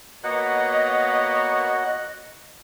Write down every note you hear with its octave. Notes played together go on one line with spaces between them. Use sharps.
A#3 B3 F#4 C#5 D#5